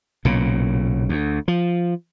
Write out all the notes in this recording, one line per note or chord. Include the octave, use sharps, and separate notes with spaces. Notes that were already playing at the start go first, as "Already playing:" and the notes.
B1 A#2 C#3
D2
F3